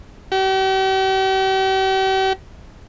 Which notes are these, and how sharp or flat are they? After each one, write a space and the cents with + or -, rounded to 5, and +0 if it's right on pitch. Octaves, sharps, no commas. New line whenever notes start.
G4 -40